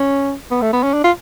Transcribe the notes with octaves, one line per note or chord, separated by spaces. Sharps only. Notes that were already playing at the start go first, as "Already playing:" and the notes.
Already playing: C#4
B3
A3
B3
C#4
D4
F4